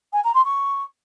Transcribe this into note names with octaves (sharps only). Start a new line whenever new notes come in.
G#5
A#5
C6
C#6